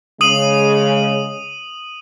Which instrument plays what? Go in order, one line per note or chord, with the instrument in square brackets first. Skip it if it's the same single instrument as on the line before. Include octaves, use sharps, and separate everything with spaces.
[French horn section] C#3 G#3 [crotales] D#6 D#7 F#7